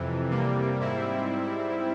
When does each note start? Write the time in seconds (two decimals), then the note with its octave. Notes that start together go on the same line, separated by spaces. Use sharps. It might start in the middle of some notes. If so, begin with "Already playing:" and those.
Already playing: F2 C3 E3
0.29 C3 G3 A#3
0.80 G#2 G3 C4 E4